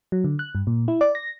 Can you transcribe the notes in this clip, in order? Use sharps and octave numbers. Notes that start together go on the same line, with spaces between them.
F#3
D3
F#6
G2
A#2
E4
D5
A#6